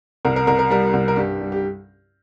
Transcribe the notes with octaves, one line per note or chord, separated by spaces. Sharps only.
C2 A#4
A#4
C2 A#4
A#4
G3 A#4
C2
A#4
G2 G4
G3
G4